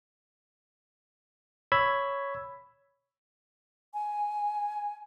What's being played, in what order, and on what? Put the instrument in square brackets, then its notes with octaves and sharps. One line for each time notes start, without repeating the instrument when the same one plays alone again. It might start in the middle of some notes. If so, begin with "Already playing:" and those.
[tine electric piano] C#5 B5 E6 G#6 B6
[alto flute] G#5